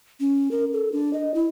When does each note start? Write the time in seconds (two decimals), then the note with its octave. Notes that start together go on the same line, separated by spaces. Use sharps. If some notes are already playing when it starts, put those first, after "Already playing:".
0.20 C#4
0.51 A#4
0.73 A4
0.92 D4
1.13 D#5
1.34 E4